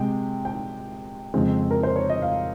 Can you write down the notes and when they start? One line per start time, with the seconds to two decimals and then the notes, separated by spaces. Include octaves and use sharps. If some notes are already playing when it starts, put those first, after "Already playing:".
Already playing: C3 G#3 G5
0.45 G5
1.34 F2 C#3 F3 G#3 C4
1.71 A#4
1.83 C5
1.96 C#5
2.10 D#5
2.22 F5